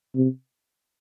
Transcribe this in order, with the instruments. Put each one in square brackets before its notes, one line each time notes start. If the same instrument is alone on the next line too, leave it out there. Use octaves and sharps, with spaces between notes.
[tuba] C3